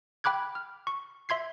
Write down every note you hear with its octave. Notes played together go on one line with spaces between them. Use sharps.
G5 B5 D6 F#6 G#6
F6
C#6
E5 C6 G#6 C7